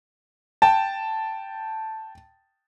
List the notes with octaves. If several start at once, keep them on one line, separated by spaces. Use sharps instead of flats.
G5 A5